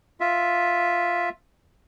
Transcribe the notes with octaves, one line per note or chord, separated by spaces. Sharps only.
F4 E5